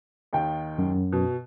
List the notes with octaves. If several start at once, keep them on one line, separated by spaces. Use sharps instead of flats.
D#2 D#3 G5
F#2
B2